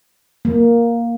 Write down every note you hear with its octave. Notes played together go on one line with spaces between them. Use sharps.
A#3